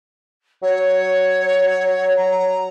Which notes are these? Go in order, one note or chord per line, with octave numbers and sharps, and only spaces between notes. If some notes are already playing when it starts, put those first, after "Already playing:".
F#3 C#5
A#5